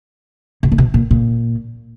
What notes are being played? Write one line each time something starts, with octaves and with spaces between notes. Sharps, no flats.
B2
A#2
B2
A#2
A#2